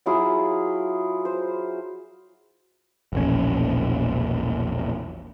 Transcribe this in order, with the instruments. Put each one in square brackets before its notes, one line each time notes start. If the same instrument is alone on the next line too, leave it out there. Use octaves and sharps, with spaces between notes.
[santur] F#3 E4 F4 G#4
C5
[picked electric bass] E1 A#1 C#4